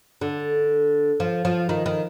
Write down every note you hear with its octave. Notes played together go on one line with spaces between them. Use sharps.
D3
F3
F3
D#3
D#3